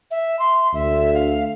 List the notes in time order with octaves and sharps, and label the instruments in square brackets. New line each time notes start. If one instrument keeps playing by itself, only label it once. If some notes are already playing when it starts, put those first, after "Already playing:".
[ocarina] E5
C6
[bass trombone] D2 [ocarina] E5
[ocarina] F5